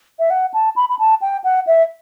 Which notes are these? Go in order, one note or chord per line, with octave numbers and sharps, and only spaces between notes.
E5
F#5
A5
B5
B5
A5
G5
F#5
E5